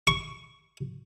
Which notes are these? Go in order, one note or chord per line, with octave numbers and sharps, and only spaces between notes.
C#6